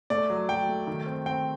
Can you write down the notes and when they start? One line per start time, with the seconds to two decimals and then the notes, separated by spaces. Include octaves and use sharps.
0.10 A3 D5
0.30 F#3
0.49 F#3 G5
0.69 A3
0.87 D#3
1.06 C4
1.26 C4 G5